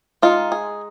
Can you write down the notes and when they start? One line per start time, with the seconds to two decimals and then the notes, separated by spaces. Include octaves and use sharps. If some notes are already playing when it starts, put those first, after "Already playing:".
0.22 G#3 D#4 F4
0.52 G#4